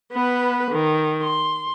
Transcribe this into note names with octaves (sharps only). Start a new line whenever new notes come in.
B3 B4
D#3
C6